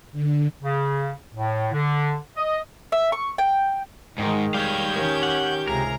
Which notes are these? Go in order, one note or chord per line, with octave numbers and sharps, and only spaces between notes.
D3
C#3
A2
D3
D#5
E5
C#6
G5
G#2 D#3 G#3 D#4 G5
G3 G4 C#5 F5 G6 G#6
D#3 C#4
F#5
C#2 C3 G#4 A#4 A#5